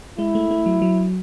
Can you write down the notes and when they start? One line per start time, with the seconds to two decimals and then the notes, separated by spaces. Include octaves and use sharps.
0.18 G#3 E4
0.35 A3
0.51 A3
0.66 F#3
0.82 F#3